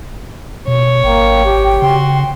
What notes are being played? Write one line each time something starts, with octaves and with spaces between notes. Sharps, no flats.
B2 C#5
G#1 A#3 G5
G4
C#3 F#4 C6